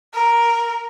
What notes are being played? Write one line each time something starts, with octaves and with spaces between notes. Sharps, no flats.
A#4